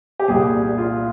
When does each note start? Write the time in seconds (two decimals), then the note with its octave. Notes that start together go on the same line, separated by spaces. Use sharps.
0.20 G4
0.28 C2 A#2 G#4
0.78 F4